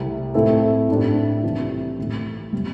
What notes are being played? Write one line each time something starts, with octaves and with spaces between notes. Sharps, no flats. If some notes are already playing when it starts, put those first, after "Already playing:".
Already playing: C2 C3 A3 E4
A2 A3 C4 E4 A4
A2 A3 D4 G4
C2 C3 E3
A1 A2 A3
C3 G3